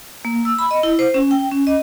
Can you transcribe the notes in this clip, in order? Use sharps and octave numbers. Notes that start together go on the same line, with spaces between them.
A#3
E6
B5
D#5
E4
C5
C#4
G5
C#4
D#5